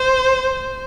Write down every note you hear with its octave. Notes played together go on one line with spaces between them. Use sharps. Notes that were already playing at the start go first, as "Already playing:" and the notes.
Already playing: C5